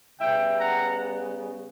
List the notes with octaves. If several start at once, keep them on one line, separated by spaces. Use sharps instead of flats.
C#3 G3 B3 E5 G5
F#5 A#5